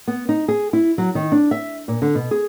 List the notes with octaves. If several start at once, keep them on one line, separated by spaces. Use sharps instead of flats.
B3
D#4
G#4
E4
F#3
D#3
D4
E5
A#2
D3
B2
G#4